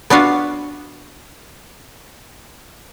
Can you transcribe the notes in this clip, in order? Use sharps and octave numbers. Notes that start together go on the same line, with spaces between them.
B3 D4 F4 F#4 F5